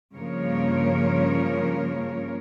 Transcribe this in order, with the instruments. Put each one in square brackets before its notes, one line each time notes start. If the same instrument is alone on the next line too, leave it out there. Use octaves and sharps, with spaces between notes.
[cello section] G2 C#3 F3 A#3 A#4 C#5